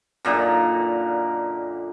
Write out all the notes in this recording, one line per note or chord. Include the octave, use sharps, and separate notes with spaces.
F#2 A#2 D3 D#4